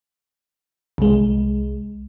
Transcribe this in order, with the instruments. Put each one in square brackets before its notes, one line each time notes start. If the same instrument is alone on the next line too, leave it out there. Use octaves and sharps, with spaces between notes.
[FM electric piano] C2 G#3